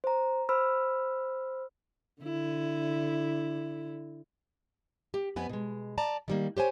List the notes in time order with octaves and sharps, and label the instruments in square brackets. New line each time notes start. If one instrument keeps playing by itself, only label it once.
[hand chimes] C5 A#5
C5 B5 E6 F6
[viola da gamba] D3 E4
[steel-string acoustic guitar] G4
F2 B3 B4 G#5
B2 G#3
D5 A5 A#5
D#3 G3 A#3
G4 C5 C#5 G#5